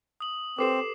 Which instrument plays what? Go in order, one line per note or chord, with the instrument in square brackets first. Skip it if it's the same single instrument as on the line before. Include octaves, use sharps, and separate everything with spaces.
[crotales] D#6 F#7
[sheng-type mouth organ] C4 [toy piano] G4 A4 B4 [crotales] D6 C7 E7